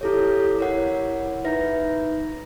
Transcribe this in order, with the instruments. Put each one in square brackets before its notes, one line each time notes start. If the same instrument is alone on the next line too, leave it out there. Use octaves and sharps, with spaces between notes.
[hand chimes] E4 A4 C#5 [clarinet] G4
[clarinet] E4 [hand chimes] A#4 C#5 F#5
[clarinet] D#4 [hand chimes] B4 E5 A#6